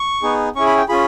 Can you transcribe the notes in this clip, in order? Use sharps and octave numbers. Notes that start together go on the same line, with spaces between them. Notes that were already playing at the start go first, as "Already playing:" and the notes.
Already playing: C#6
B3 D#4 G#4
C#4 E4 G#4 C#6
B5
G5
C#4 F4 G#4 B5